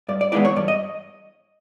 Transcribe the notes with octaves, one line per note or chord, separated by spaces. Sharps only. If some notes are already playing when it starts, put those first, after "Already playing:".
G2 D5
D5
E3 G#3 B3 E4 D5
C#5
G2 D5
D#5